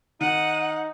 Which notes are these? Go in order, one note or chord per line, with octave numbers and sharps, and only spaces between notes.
D#3 D#4 F#5 D#7